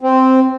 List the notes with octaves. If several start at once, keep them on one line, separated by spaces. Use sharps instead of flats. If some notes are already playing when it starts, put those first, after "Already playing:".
C4